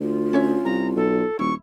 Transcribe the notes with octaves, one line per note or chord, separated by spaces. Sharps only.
D2 F4
C#4 C#5 E5
C2 A#5
B1 A4
D#1 E4 C#6